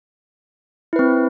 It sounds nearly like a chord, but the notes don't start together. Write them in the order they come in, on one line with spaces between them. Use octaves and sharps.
E4 B4 C4